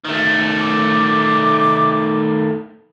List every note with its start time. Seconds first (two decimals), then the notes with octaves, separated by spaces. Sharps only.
0.04 D#3 A3
0.59 D6